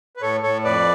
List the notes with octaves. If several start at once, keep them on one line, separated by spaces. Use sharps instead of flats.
B4
A2 A4 C#5
A2 A4 C#5
F2 B4 D5